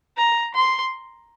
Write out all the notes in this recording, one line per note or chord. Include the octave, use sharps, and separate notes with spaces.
A#5
C6